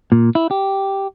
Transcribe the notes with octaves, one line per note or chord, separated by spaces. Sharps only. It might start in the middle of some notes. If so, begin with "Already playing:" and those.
A#2
E4
G4